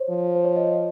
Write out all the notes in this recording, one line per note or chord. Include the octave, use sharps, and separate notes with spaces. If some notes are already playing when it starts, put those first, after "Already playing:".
Already playing: C5 C#5
F3
C5
C#5
D#5
D#5